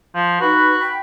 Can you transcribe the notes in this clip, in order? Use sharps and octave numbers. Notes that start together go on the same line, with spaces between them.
F3
D#4 F#4 B4
G5 B5